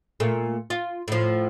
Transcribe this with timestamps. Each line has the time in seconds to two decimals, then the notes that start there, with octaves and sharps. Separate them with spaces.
0.20 A#2 A3
0.70 F4
1.08 A2 F3